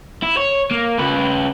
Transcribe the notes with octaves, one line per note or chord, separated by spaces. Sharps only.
E4
C#5
A#3
C#3 B4